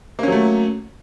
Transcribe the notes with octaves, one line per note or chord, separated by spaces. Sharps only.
F#3 A3 A#3 C#4